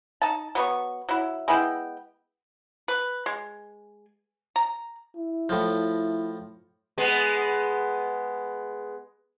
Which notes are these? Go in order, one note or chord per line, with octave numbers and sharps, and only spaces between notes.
D#4 A5
F#3 B3 C#6
F#3 E4
G#3 B3 E4 G5
B4
G#3
A#5
E4
A2 F3
G#3 B3